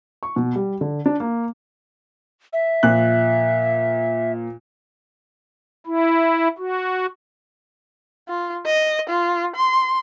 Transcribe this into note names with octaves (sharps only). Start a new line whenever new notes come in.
C#6
B2
G3
D3
D4
A#3
E5
A#2 F3 F#6
E4
F#4
F4
D#5
F4
C6